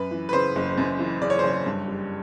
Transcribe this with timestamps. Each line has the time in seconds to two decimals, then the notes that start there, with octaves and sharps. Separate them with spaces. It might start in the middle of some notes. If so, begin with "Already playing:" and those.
Already playing: F#2 B4
0.11 E3
0.29 B4
0.33 C#3 C5
0.56 F#1
0.78 F#2
0.99 E3
1.21 C#3 D5
1.30 C#5
1.39 C5
1.44 F#1 C#5
1.66 G2
1.88 G3